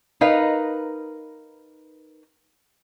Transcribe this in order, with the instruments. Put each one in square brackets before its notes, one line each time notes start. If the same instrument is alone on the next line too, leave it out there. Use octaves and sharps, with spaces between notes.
[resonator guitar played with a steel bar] D#4 A#4 B4 D#5 F5